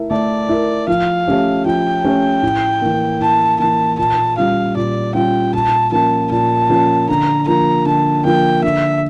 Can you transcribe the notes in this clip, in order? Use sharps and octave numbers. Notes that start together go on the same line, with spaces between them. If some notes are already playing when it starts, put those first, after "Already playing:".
Already playing: A3 E4 A#4
A3 D5
E4 A#4
F3 F5
A3 C#4 G4
F3 G5
A3 C#4 G4
A2
E3 A#3
A2 A5
E3 A#3 A5
A#2 A5
G3 C#4 F4 F5
A#2 D5
G3 C#4 F4 G5
A#2 A5
F3 A#3 C#4 A5
A#2 A5
F3 A#3 C#4
D3 A#5
F3 A#3 A#5
D3 A5
F3 A#3 G5
D3 E5